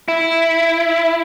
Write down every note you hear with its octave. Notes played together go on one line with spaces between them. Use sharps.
E4